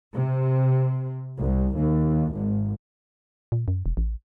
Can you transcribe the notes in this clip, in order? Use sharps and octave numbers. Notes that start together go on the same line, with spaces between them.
C3
C2
D#2
G#1
A#2
F#2
E1
A1